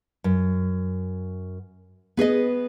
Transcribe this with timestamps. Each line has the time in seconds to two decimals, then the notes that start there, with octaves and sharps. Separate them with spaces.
0.24 F#2
2.17 B3 G#4 B4 D#5